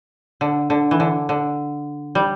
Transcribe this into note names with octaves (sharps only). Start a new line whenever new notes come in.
D3
D3
E3
D3
D3
G3